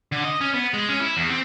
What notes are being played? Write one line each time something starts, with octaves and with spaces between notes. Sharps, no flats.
D3
D#5
C#4
B3
G#3
C#4
E4
E2
C4